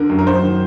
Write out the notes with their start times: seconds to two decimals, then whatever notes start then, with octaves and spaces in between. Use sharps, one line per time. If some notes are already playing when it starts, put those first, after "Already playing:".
Already playing: D3 A#4
0.10 F#2
0.19 A#4
0.27 F#2 C5
0.43 D#3